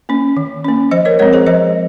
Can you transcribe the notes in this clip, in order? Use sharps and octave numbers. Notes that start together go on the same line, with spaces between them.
A#3 C#4
D#3
A#3 C#4
F3 C5 D#5
A#4 C#5
G#3 C4 A#4 C#5
G#4 C5
F3 C5 D#5